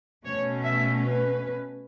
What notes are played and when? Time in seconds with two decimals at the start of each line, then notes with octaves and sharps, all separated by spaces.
0.25 B2 A3 C#4 C#5
0.63 E5
1.02 B4